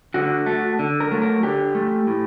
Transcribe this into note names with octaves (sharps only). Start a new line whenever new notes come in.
D3 F#4
A3
D3
A#4
F#3 A3
A#4
D3 G4
A3
A2